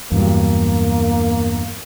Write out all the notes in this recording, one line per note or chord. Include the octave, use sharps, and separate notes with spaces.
E2 G2 F#3 A#3